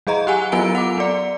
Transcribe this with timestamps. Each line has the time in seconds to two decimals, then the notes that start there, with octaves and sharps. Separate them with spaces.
0.07 F#3 G#4 D#5 A#5
0.27 G4 F#5 G#5
0.52 F#3 B3 F4 A#4 G#5 D7
0.75 F#5 D6
0.98 B3 D5